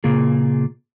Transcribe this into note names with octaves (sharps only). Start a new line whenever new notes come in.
A#2 C#3 A#3 F4 G#4